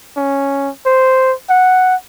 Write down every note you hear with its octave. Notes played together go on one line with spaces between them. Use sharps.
C#4
C5
F#5